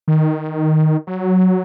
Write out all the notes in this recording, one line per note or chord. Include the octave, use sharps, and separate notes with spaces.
D#3
F#3